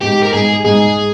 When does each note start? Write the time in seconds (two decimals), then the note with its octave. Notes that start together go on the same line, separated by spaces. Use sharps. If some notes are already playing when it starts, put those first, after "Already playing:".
0.01 G#2 G4
0.23 A#4
0.33 G#2 G#4
0.65 G#2 G#4